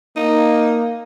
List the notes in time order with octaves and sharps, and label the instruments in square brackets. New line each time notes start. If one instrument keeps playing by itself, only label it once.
[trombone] A#3 [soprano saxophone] D#4